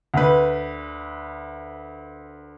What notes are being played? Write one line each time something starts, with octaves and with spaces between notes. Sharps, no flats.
D2 B4